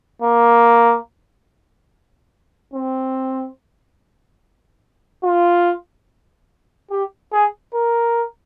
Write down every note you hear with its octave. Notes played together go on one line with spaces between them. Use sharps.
A#3
C4
F4
G4
G#4
A#4